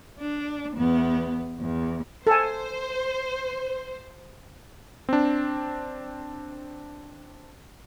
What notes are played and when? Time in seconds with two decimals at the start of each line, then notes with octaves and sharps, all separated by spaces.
0.21 D4
0.77 E2 B3
1.60 E2
2.27 A4 C5 G#5
5.09 C4 D4